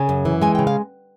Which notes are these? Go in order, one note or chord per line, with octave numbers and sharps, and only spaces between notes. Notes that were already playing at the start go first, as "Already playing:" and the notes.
Already playing: C#3 G#5
F#2
E3
G#3 G#5
C#3 G5
F5